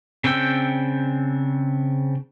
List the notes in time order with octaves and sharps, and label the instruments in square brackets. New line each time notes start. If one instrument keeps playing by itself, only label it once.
[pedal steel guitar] C#3 C4 D4 G5 E6